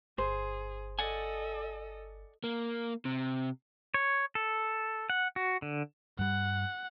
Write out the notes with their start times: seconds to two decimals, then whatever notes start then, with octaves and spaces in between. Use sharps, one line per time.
0.18 G1 G#4 C5
0.99 A4 D5 D#5 F#5 G#5
2.44 A#3
3.05 C3
3.94 C#5
4.35 A4
5.10 F#5
5.36 F#4
5.62 D3
6.19 G2 G3 F#5